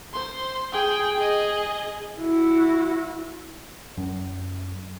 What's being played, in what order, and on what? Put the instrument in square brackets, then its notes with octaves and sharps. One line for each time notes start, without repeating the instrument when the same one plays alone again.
[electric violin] C5 C6
G#4 G5
G#4 D#5
[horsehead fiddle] E4 F#4
[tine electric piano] F#2